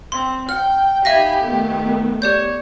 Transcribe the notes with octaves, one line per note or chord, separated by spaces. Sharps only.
C4 C6
G5 F6
D#4 G4 E5 F5 G#5 B5 A#6
D#3 A3 B3
G4 C#5 D5 G6